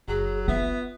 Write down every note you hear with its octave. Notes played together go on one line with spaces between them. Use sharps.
F#1 F#3 G#4
B3 F4 E5